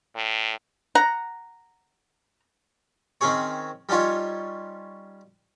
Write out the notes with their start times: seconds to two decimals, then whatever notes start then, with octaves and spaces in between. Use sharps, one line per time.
0.16 A2
0.95 F#5 A#5
3.21 D#3 C4 C#4 G#4 C#5
3.89 G3 C#4 D#4 F4 C#5